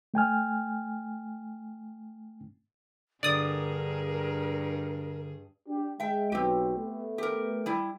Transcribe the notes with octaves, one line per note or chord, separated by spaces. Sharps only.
A3 G5 G#5 F6
G2 D3 G#4 A#4 D5 D#6
D4 G4
G#3 E5 G5
B1 C4 G4
A3 B3
G4 A#4
G3 E4